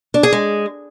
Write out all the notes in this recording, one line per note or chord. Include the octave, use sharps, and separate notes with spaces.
D4
G#4
G#3